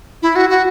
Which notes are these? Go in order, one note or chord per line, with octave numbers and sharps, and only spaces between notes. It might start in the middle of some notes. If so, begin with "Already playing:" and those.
E4
F#4
F#4